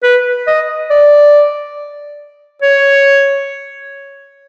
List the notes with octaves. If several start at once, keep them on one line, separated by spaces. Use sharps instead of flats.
B4
D#5
D5
C#5